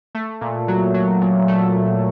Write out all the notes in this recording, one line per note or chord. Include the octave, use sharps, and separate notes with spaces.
A3
A#2
F#3
F#3
A#2
A3